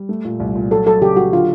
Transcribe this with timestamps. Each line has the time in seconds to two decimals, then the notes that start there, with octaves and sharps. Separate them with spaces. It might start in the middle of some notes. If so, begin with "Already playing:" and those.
Already playing: G3
0.09 A3
0.25 A#2
0.40 C2
0.56 A#2
0.71 F#3 A4
0.86 F#3 A4
1.01 C#3 G4
1.17 F#3 F#4
1.32 D3 F4